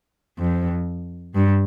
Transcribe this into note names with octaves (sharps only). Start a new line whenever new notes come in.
F2
G2